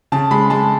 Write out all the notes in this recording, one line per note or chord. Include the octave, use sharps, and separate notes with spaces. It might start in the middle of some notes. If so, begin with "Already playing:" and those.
C#3 A5
G#3 B5
G#3 A5